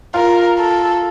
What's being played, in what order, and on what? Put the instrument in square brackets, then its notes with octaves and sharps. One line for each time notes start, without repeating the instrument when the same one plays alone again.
[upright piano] F4 [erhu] A#4
[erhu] A4